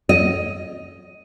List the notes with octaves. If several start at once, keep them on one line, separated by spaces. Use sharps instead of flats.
D#5